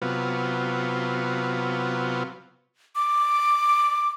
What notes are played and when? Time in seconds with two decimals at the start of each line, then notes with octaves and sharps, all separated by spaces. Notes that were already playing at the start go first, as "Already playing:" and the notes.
0.02 C3 F#3 B3 F4
2.95 D6